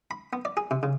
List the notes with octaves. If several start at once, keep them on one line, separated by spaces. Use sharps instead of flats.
B5
B3
D5
G#4
C3
C#3